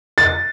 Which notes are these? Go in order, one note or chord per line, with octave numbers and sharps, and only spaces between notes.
A6